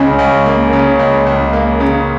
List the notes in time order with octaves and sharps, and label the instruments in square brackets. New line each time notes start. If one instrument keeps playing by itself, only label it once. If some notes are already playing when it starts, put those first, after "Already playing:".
Already playing: [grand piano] C#2 C#3 [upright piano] C#4
[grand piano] C#2
A#3
C#3
C#2
C#2
A#3
C#3